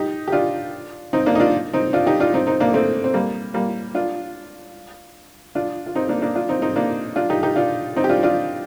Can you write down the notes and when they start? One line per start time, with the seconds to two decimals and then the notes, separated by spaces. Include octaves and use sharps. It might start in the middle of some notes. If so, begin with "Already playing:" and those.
Already playing: D#4 G4
0.28 G4
0.32 D4 F4
1.13 C4 D#4
1.26 A#3 D4
1.35 D#4
1.40 D4 F4
1.73 C4 D#4
1.93 D4 F4
2.06 D#4 G4
2.20 D4 F4
2.34 C4 D#4
2.47 C4 D#4
2.60 A#3 D4
2.74 A3 C4
3.04 C4
3.14 G3 A#3
3.54 G3 A#3
3.95 D4 F4
5.55 D4 F4
5.86 F4
5.96 C4 D#4
6.09 A#3 D4
6.22 A#3 D4
6.35 D4 F4
6.49 C4 D#4
6.62 C4 D#4
6.76 A#3 D4
7.16 D4 F4
7.30 D#4 G4
7.43 D#4 G4
7.56 D4 F4
7.96 C4 D#4
8.04 G4
8.09 D4 F4
8.23 D4 F4